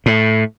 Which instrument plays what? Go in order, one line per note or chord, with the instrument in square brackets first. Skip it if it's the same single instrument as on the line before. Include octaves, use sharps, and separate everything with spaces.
[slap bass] A2